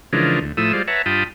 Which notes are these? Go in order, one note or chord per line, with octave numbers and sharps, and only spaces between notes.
C#3 E3 F3 G#3 D4 A#4
D2
A2 F3 A3 E4 D#6 E6
G3 G#3 F4 C5 D5
B4 C#5 E5 F#5 A5 A#5
G2 F4 G5 A5 B5 D#6